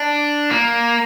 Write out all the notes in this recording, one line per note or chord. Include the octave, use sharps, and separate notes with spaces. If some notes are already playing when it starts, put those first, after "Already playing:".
Already playing: D4
A#3